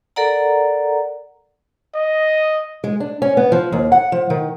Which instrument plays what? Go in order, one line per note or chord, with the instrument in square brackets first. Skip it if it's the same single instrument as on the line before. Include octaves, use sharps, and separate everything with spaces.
[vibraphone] A4 A#4 D5 F#5 A#5
[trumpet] D#5
[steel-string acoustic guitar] G#3
D4
C#4
B3
F3
D#2
F#5
F3
D#3